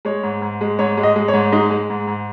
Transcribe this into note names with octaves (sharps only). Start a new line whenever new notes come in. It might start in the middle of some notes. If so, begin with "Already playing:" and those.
G#3 C#5
G#2
G#2
G#3
G#2 C#5
G#3
D#5
G#3
C#5
G#2
G#3 D#4
G#3
G#2
G#2